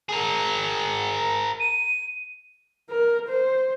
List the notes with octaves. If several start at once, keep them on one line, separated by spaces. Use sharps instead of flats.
G#4 A#4
D#7
A#4
C5